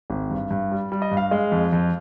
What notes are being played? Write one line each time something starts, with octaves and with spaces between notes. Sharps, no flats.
G#1
G2
G2
G3
G3
D#5
G2
F5
G#3
F2
F2